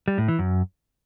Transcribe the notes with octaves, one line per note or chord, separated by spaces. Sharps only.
G3
A2
E3
F#2